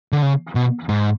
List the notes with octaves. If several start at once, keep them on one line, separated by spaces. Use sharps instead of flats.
D3
C#3
B2
G#2